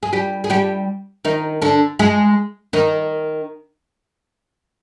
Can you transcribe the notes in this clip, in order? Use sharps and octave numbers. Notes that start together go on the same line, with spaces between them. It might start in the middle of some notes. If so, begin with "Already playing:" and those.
G#4
G3 G4
G#4
G3 G4
D#3 D#4
D3 D4
G#3 G#4
D#3 D#4